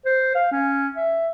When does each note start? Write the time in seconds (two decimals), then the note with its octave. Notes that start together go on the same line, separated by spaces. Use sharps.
0.06 C5
0.35 F5
0.52 C#4
0.96 E5